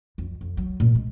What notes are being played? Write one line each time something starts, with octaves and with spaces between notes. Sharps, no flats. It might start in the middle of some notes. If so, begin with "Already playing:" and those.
F2
F2
F#3
A#2
G#3